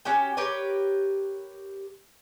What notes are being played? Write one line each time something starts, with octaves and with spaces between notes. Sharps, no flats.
C#4 F#4 G4 G5
G4 A#4 B4 C#5